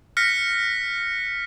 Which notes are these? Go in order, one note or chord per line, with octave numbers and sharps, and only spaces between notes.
F6 F#6 A#6 B6 C#7